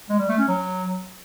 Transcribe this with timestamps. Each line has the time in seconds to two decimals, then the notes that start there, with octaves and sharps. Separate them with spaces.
0.10 G#3
0.19 G3
0.29 A3
0.38 C#4
0.48 F#3